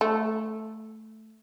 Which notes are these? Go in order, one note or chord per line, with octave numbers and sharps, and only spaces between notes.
A3